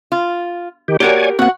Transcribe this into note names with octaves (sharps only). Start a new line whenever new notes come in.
F4
D#3 G4
A#3 F#4 G4 A#4 C#5 D5 G#5
A#3 C4 F#4 F#5